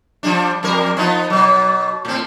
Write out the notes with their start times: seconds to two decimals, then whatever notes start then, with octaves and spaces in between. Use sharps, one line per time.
0.23 F3 G3 D4
0.63 F2 G3 A#4
0.97 F3 B3 D#4
1.30 B2 F#3
2.05 A2 C4